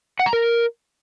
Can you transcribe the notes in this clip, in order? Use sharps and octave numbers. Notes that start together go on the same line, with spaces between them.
F#5
A#5
A#4